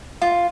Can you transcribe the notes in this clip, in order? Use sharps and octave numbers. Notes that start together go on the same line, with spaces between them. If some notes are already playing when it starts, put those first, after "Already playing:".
F4